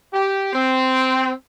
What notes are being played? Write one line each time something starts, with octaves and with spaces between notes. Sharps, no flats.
G4
C4